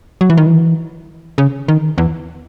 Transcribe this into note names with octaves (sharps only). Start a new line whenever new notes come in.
F#3
E3
D#3
E3
C#3
D#3
E2